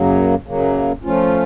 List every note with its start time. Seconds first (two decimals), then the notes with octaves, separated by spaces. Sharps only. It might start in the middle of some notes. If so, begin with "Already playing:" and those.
Already playing: F#2 C#3 F#3 A#3
0.46 F#2 C#3 F#3 A#3
1.03 F3 A3 C#4 F4